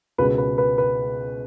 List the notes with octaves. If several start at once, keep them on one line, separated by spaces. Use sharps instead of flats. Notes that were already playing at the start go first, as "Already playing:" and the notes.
C#2 B2 B4
B4
B4
B4